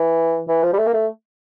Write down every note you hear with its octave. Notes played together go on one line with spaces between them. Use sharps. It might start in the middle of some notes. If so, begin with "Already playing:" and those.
Already playing: E3
E3
F3
G3
A3
A#3
A3